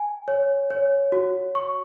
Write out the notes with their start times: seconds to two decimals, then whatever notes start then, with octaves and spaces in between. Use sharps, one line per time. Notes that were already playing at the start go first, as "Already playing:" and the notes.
Already playing: G#5
0.28 C#5
0.70 C#5
1.12 F#4
1.55 C#6